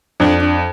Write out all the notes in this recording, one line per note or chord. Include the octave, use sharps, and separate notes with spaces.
F2 D4
D4